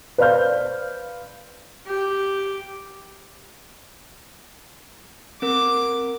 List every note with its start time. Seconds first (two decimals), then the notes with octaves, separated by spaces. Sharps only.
0.18 B4 C5 D5 F5 F6 G6
1.87 G4
5.42 C4 A#4 D6